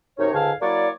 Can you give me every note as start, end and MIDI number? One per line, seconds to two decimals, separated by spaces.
0.19 0.32 42
0.19 0.32 48
0.19 0.32 63
0.19 0.32 73
0.33 0.52 37
0.33 0.52 44
0.33 0.52 50
0.33 0.52 77
0.33 0.52 80
0.33 0.52 81
0.62 0.89 54
0.62 0.89 58
0.62 0.89 64
0.62 0.89 73
0.62 0.89 74